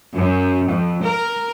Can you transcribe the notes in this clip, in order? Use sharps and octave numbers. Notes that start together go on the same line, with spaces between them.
F#2
F2
A#4